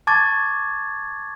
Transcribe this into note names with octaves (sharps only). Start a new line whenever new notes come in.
A5 C#6 D6 G#6 A6